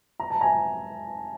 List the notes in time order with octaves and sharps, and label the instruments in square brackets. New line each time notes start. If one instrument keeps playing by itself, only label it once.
[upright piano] A#5
A5
G#5 A#5